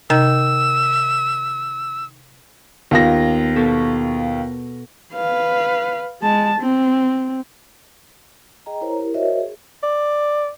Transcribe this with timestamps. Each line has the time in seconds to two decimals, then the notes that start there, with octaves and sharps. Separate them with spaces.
0.10 C3 D#3 E6
2.91 D#2 B3 F4 A#6
3.56 B2 A4 A5
5.13 B4 F5
6.22 G#3 A5
6.60 C4
8.66 G#4 D#5 G5 A#5
8.81 E4 A#4 C5 C#5 A#5
8.99 E4 G4 A#4
9.14 F#4 A#4 C5 C#5 D#5 E5
9.40 G#4
9.83 D5